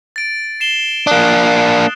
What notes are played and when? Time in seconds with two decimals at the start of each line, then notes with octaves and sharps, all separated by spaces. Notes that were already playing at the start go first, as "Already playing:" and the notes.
0.16 A6 D7
0.60 C7 E7 G7
1.07 A#3 D4 D#6 F#6